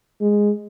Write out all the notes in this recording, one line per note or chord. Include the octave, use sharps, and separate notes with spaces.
G#3